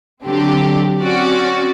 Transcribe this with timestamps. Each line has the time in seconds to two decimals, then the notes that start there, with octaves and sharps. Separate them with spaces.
0.24 D3 F#3 C4 D4 G4
1.01 C4 C#4 F#4 D5